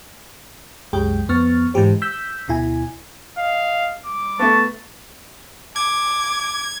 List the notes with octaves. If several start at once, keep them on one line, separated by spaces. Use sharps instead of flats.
C2 F#2 G#3 G4 G5
F2 B3 C#6 F6 A6
G#2 D3 E3 G4 C5
E6 G6 B6
D2 B2 E4 G#5
D#5 F5
G3 D6
A3 B3 A5 C#6
D6 G#6